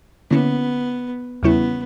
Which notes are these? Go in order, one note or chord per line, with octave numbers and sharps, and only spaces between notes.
D3 A#3 B3 C#4 E4
E2 C#3 G3 B3 C#4 E4